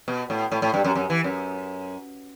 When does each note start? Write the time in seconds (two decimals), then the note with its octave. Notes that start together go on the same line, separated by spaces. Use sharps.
0.08 B2
0.30 A2
0.52 A2
0.62 A2
0.74 G2
0.85 F#2
0.95 F#2
1.10 E3
1.24 F#2